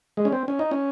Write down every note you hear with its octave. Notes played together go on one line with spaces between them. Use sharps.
G#3
C#4
C4
C#4
D#4
C#4